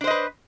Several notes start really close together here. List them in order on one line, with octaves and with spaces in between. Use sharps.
D4 C5 D#5 B4